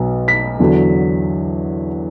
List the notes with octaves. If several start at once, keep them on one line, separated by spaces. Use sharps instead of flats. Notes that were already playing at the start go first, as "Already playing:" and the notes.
Already playing: B1 B2 F#3 B3
B6
E2 D3 F#3